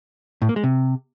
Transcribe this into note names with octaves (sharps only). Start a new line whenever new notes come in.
A2
A#3
G#3
C3